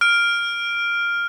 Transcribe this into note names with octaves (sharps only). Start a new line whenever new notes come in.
F6 D7